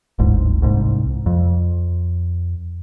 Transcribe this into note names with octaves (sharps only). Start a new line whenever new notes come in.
D1 G1 G#2
C2 G#2
F2